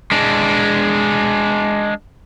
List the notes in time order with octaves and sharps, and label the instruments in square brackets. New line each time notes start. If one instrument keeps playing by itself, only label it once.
[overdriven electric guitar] G#3 D4